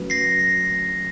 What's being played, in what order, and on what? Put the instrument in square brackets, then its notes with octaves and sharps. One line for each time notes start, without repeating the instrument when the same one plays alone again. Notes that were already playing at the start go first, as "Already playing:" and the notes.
Already playing: [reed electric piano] F#3 A3 C#4 F#4 B4
[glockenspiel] A#6 C7